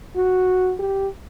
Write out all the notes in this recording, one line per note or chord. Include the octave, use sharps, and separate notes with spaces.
F#4
G4